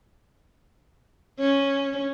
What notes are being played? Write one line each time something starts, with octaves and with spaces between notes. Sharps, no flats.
C#4